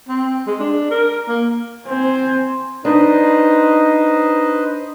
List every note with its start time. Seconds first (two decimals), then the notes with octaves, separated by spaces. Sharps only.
0.08 C4
0.47 G#3
0.60 D4
0.91 A#4
1.29 A#3
1.87 C4 C5 G#5
2.85 D4 D#4 B4 C5 D#5